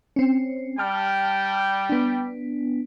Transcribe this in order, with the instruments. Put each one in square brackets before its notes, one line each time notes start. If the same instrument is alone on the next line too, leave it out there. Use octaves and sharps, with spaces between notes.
[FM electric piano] C4 C#4
[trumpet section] G3 G5 [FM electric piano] A5 F6
[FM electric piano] B3 D4